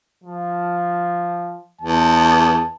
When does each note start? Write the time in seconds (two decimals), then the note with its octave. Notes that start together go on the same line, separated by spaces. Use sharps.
0.24 F3
1.81 E2 A5